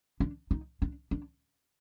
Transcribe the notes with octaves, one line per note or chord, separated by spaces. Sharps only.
D4
D#4
D4
D4